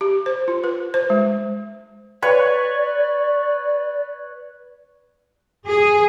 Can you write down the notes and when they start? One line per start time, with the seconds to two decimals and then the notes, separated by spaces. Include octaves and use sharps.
0.01 G4
0.26 C5
0.48 F4
0.64 B4
0.94 C5
1.10 G#3
2.22 B4 C#5 D5 C#6
5.67 G#4